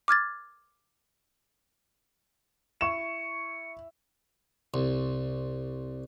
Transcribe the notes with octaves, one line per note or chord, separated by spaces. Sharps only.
D6 F6 G#6 A6
E4 C#6 C#7 E7
C2